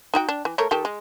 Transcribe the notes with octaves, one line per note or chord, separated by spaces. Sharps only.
D#4 F#4 G5
D4
E3
A3 A#4 C#5
D#3 G4 A4
G#3